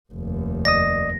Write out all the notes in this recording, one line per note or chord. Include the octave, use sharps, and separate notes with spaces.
F1 D#2
D5 D#5 D#6 A#6